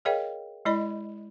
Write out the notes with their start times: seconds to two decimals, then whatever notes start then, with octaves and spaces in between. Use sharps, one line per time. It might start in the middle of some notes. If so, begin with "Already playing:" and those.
0.05 G#4 A#4 C#5 D#5 F5 G5
0.65 G#3 E4 D5 D#5 B5